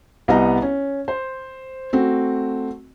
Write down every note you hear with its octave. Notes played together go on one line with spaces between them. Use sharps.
C2 B3 G4 D#5 A#5
C#4
C5
A3 C4 F#4